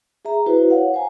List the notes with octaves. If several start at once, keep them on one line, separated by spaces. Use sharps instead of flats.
G#4 E5 A#5
E4 F#4 B4 C5
C#5 F5 F#5
C5 G#5 A#5